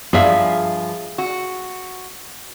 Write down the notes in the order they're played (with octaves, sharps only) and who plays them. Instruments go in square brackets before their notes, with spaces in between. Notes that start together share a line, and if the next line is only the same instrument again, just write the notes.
[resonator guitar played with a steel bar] G2 F3 [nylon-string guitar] G#4 E5 F5
[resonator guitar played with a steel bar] F#4